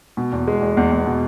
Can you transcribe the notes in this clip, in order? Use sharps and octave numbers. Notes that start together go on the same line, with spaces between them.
B2
E2
G#3
E2
E2
E2
B2